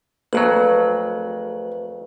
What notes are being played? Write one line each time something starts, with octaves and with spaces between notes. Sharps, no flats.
G#1 F2 F#3 A3 B4